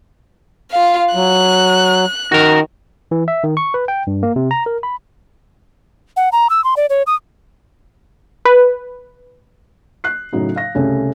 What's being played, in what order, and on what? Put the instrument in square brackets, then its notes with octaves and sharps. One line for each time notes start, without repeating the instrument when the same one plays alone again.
[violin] F4 F5
[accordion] F#3 [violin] F#6
[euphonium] D#3 [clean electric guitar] F#4 A#4
[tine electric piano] E3
E5
D#3
C#6
B4
G5
G2
A#3
C3
A#5
A#4
B5
[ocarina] F#5
A#5
E6
C6
D5
C#5
D#6
[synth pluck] B4
[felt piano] F#6 C7
A2 C#3 F#3 D#4
F5 A#6
C2 C#3 A3 C#4